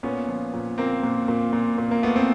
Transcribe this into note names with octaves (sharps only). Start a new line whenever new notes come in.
A#2 B3 C#4
F3
A#2
A#2 A#3 C4
A#2
A#2
A#2
A#2
A#3
A3 B3
C4